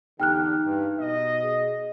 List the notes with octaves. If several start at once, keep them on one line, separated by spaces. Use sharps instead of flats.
E2 D3 D#4 G4 G5 F6 F#6
G2
B2 D#5
G#4